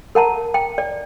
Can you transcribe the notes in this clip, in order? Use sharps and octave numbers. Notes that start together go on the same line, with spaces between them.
A#4 F#5 A5 A#5
G5
D5